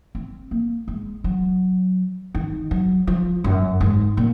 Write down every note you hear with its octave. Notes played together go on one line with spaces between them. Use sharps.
C4
A#3
G#3
F#3
D#3
F#3
F3
F#2
G#2
A#2